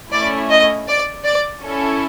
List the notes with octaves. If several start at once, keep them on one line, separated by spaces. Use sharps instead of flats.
A3 C#4 E4 D5
D#5
D5
D5
C#4 E4 A4